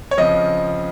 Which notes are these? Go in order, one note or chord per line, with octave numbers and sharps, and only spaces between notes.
C#5
F2 C#3 F3 D#5